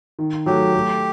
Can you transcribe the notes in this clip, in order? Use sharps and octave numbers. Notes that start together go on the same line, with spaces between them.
D#3
F#3 A3 G4
A3